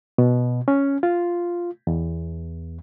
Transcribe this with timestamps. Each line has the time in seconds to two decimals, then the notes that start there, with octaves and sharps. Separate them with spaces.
0.18 B2
0.68 C#4
1.03 F4
1.87 E2